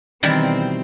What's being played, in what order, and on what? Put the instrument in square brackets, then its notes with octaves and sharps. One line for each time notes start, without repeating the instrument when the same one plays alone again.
[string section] B2 C4 [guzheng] D#3 E3 G3